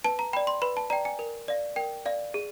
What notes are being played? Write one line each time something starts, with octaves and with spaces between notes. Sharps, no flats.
B4 A5
A#5
D5 G5 B5
C6
B4 B5
A5
D5 G5 A#5
G#5
A#4
D5 F5
A#4 G5
D5 F5
G#4